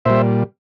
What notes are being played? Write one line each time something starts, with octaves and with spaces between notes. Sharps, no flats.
A#2 G3 C5 E5